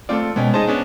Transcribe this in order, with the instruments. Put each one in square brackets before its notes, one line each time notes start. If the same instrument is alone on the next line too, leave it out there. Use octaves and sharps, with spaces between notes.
[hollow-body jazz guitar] A3 C4 D5 [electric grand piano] F4 A4
[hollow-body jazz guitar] B2 G#3 [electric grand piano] B3 C#4 G5
[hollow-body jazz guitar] D#4 G#4 C5 [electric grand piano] D#5 A5
[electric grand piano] B3 C#4 D4